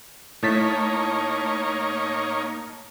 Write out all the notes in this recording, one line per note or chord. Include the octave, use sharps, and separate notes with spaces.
A2 A#3 D#4 C#5 A5 B6